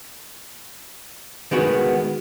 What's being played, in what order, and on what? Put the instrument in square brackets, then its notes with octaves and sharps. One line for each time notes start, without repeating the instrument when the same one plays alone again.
[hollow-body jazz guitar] D#3 G#3 B3 F#4